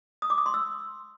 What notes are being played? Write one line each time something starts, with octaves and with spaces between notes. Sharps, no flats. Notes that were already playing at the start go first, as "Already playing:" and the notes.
D#6
D6
D#6
C6
E6